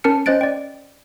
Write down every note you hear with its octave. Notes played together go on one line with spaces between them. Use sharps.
C#4 A#4 A5 F6 C#7
C#4 C5 D#5 F#6 A6 D7
D5 G5